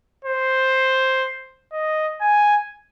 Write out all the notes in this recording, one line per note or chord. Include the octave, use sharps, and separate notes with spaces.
C5
D#5
G#5